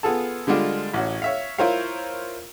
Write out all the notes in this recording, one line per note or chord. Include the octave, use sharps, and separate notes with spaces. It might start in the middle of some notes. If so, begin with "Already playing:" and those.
B3 F4 G#4 A4 A5
D3 G3 G#3 D4 F4
A1 F#4 C#5
C#5 E5 F5
E4 F4 A#4 C5 C#5 F5